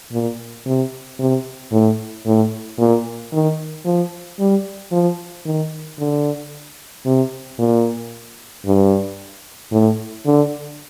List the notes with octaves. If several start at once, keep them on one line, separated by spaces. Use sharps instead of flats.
A#2
C3
C3
A2
A2
A#2
D#3
F3
G3
F3
D#3
D3
C3
A#2
G2
A2
D3